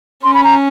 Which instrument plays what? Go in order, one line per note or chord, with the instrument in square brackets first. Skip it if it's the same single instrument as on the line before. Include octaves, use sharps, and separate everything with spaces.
[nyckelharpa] C#4 [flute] C6
[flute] B5
A#5